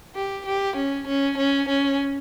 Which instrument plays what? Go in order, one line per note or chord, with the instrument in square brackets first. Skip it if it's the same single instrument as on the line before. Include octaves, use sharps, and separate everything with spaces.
[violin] G4
G4
C#4
C#4
C#4
C#4